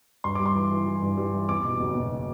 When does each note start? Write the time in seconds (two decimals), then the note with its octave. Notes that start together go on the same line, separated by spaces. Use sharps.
0.24 G2 C6
0.35 G3 D6
0.46 C6
0.55 E3
0.71 E3
0.86 E3
1.02 G2
1.17 G3
1.33 E3
1.49 E2 D6
1.64 B2
1.80 F#1
1.95 B2